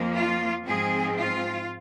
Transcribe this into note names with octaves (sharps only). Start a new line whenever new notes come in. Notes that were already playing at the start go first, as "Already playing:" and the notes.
Already playing: F2 F3 A#3
F4
G#2 F3 C4 G#4
F4